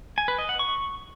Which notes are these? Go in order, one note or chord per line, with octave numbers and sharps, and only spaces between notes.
G#5
B4
D#5
F#5
C#6